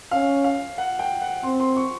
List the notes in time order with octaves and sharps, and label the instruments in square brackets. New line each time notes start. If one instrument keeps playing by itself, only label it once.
[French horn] C#4 [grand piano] F5
[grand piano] F5
F#5
G5
F#5
[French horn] C4 [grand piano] C6
[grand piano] C6
C#6